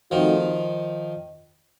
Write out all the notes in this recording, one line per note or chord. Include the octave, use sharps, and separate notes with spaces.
D#3 F3 A3 C4 D#4 F#4